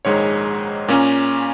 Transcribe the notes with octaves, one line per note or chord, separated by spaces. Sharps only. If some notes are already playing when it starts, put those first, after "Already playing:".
A#1 G#2 D#3 G#3 C#5
A#2 A#3 C#4